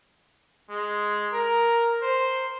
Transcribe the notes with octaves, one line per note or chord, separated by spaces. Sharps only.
G#3
A#4
C5